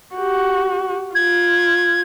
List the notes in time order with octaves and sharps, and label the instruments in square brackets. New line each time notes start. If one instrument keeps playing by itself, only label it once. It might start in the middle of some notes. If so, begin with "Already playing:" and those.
[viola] F#4 G4
[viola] F4 [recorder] G#6